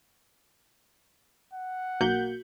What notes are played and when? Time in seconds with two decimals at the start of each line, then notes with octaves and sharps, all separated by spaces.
1.53 F#5
2.01 B1 A#3 F#4 G6